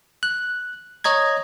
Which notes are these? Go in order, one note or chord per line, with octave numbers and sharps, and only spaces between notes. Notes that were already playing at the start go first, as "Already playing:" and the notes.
F#6
C#5 D#5 A#5 G#6